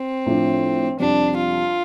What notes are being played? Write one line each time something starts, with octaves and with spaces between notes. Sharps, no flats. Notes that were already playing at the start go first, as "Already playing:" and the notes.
Already playing: C4
A2 F3 D4
F2 C3 G3 D4
F4